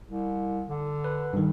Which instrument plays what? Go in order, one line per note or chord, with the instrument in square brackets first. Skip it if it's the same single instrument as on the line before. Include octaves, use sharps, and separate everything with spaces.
[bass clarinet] C2
D3
[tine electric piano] B4
G2 D#3